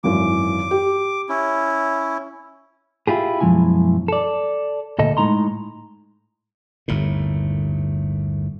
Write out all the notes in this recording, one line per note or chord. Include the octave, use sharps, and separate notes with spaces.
G#1 F#2 E3 D6
G4
C#4 E4
E4 F4 G4 G#4
F#2 B2 F3 G#3 E4 G#5
A4 D5
D2 A#2 A4 D#5
A2 G#3 D#4 A#5 C6
G1 D#2 A2